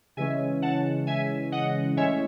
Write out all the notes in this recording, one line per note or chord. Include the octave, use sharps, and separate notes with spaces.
C#3 E3 G#3 C#4 E5 G#5
F#5 A5
E5 G#5
D#5 F#5
A2 G#3 C#4 C#5 E5